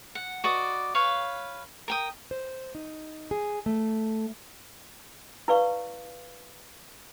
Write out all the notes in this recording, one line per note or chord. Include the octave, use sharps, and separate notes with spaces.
F#5
F#4 B4 D5 D#5
B4 C#5 F5
A#4 G5 D#6
C5
D#4
G#4
A3
E4 B4 D5 F5 C#6